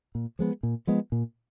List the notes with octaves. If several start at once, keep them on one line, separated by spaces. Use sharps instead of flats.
A#2
F3 G#3 B3
A#2
F3 G#3 B3
A#2